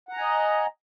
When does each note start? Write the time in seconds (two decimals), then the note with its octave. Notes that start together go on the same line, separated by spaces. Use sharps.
0.09 F#5
0.13 A#5
0.17 G#5
0.21 D#5